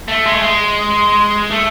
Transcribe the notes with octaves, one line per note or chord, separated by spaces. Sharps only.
A3
G#3
A3
G#3
A3